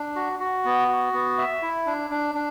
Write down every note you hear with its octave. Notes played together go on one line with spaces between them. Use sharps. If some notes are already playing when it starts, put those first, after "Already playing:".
Already playing: D4
F#4
F#4
B3
F#4
B3
E5
E4
D4
D4
D4